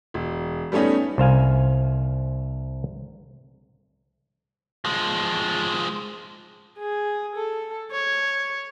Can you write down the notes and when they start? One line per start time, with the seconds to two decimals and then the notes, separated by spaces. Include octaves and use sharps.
0.14 E1
0.72 G3 A3 B3 C#4 D#4
1.18 C2 C5 F5 G#5
4.85 F3 G#3
6.79 G#4
7.36 A4
7.92 C#5